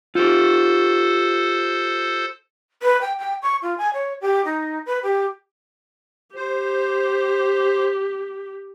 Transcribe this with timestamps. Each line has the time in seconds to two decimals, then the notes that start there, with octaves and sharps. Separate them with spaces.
0.15 F4 G4 A4 C5
2.83 B4
3.01 G5
3.19 G5
3.42 C#6
3.63 F4
3.78 G#5
3.94 C#5
4.21 G4
4.45 D#4
4.86 B4
5.03 G4
6.35 G4 C5